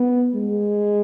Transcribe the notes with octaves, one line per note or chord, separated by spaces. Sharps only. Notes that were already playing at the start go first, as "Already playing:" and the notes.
Already playing: B3
G#3